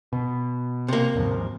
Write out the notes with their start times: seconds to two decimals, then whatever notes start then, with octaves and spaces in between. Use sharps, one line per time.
0.13 B2
0.88 C3 A#3
1.15 D#2 G#2 F3